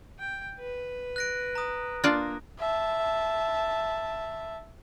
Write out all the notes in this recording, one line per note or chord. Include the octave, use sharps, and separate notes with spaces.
G5
B4
F#6 A#6 D7
A#5 D#6
A#3 D4 F4 D5
E5 A5